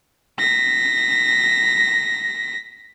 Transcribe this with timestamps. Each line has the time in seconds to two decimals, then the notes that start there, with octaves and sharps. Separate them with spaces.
0.39 A#6 B6